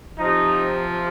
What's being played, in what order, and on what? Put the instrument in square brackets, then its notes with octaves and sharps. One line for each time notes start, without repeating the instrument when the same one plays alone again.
[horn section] C3 F3 D#4